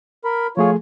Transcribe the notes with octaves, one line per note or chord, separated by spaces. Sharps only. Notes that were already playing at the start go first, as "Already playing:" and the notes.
A#4 B5
F3 A3 F4 G#4 C#5